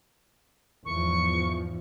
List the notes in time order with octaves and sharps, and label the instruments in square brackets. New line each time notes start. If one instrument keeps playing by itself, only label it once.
[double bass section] E2 G#2 F3 [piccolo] C#6